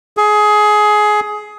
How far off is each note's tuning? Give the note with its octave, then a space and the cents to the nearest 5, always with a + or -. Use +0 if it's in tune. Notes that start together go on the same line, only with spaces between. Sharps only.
G#4 +20